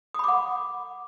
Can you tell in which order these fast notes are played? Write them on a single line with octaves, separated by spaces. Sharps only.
D#6 B5 D6 F#5